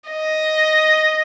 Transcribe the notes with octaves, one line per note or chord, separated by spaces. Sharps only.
D#5